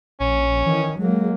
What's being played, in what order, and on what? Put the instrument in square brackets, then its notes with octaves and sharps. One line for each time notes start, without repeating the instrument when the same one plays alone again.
[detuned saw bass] A#1 [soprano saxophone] C#4
[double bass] D#3 [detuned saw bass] E3
[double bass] F#3 A#3 [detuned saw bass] G#3